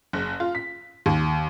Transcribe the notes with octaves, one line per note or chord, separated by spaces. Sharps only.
F#1
F4
B6
D#2